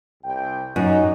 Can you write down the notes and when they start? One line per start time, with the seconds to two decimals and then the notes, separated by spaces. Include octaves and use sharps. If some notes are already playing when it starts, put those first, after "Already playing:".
0.23 C2 G5
0.76 F#2 D#4